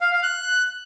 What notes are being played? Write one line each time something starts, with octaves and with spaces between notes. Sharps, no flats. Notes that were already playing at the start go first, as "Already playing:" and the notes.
F5
F5
F#6